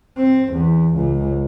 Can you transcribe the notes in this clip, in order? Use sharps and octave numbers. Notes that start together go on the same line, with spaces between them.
C4
E2
C#2